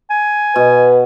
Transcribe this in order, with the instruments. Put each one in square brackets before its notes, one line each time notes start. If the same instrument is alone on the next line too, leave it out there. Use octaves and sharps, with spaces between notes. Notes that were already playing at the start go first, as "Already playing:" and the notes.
[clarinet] G#5
[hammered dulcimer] B2 [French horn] B4